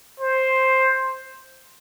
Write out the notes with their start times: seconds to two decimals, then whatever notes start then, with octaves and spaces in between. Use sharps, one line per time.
0.20 C5